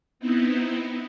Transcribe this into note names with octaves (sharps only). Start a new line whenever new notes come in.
B3 C4 D#4 E4